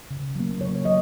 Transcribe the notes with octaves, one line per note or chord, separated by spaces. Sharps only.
C#3
F#3 A#3
C#3 C#5
F#3 D#5